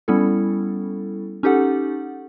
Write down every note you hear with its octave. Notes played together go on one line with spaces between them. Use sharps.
G3 B3 C#4 E4 A4
C#4 D#4 G4 A4 F#5